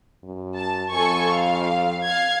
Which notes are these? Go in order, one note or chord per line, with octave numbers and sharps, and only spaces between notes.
F#2
A5
F2 A4 G#5 C#6
F5
F5 G#6